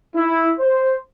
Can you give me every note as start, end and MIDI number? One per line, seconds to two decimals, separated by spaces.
0.15 0.52 64
0.60 0.96 72